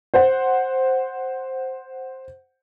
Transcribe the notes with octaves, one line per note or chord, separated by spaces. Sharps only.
C5 F#5